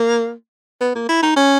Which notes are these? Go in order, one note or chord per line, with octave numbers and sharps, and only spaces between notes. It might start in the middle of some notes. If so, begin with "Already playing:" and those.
Already playing: A#3
B3
A#3
E4
D#4
C#4